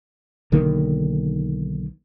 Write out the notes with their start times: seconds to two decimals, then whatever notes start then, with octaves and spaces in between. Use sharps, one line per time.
0.52 B1 D3 D#3 A#3